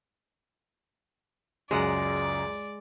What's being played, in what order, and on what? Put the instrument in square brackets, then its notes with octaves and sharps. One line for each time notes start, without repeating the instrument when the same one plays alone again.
[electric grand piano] C#2 F#2 [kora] G#3 F#5 [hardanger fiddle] D5